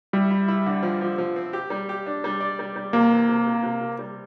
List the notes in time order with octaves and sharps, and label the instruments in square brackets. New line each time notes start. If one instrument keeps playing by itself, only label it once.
[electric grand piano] G3 [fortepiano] E4
[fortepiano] E4
E4
D3
F3
F3
F3
C4
G4
G3
G4
D4
G3
D5
G3
G3
[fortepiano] C3 [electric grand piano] A#3
[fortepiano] E3
C3
C3
C3
C3
G3